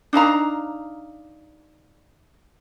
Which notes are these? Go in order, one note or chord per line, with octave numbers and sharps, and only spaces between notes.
D4 D#4 F5 A#5